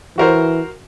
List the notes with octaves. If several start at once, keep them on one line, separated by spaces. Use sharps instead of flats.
E3 F#4 A#4 C5